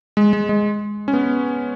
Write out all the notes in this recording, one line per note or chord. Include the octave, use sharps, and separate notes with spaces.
G#3
G#3
G#3
C#4
B3